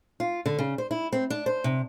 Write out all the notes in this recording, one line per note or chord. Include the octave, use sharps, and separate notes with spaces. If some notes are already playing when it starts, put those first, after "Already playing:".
F4
D3
C#3
C5
E4
C4
D4
C5
C3